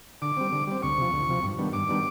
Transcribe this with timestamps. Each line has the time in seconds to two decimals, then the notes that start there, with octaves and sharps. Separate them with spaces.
0.22 D3 D6
0.37 G3 C4
0.52 D3
0.67 G3 C4
0.83 D2 C#6
0.98 C3 F3
1.13 D2
1.29 C3 F3
1.43 G2
1.58 D#3 G3 B3 D4
1.73 G2 D6
1.89 D#3 G3 B3 D4